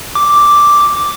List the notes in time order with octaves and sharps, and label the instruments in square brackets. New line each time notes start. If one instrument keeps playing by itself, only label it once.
[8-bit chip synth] D6